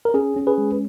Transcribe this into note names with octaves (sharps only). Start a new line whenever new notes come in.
A#4
C#4 G#4
C#4
G#4 B4
G#3